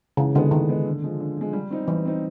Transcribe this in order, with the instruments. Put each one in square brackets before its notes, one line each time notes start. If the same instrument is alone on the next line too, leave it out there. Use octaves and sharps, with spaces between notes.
[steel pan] C#3 [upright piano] E3
[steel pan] D3 [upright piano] G#3 B3
[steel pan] D#3 [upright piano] E3
[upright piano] G#3 B3
D3
F3 G#3
D3
F3 G#3
G3
C4 D#4
[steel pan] E3 [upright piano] G3
[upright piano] C4 D#4